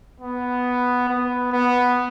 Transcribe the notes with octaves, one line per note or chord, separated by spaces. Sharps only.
B3
B3
B3